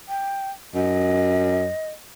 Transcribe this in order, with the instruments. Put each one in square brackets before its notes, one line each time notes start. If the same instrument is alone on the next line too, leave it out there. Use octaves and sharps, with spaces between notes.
[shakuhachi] G5
[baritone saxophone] F#2 [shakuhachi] D#5